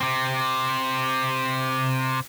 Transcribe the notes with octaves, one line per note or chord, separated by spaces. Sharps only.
C3 C4